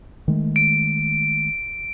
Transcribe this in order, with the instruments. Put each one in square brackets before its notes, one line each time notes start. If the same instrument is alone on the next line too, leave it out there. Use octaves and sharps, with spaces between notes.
[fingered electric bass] D#3 G#3 A3
[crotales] D7